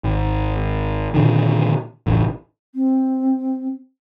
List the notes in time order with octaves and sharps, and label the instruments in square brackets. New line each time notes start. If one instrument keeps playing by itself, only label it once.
[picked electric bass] G#1
A#2 D3 D#3
E1 A1
[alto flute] C4